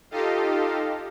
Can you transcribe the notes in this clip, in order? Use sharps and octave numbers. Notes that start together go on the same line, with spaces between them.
D#4 F4 G4 A4 D#5 F5